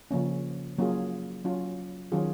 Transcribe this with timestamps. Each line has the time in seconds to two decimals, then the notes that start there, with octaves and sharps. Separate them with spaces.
0.11 C#3 F3 A#3 C#4
0.78 F#3 A#3 C#4 F4 G#4
1.45 F#3 C#4 F4
2.12 D#3 F#3 C#4 F4 G#4